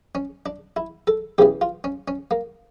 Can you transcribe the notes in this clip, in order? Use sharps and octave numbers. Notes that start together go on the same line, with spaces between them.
C#4
D4
E4
A4
E2 C#3 E3 G4
F4
C#4
C#4
A#3